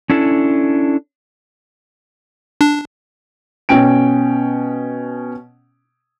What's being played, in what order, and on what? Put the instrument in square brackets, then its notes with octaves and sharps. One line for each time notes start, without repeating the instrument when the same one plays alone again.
[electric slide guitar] C#4 D4 E4 A4
[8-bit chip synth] D4
[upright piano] B2 C#4 G5 D7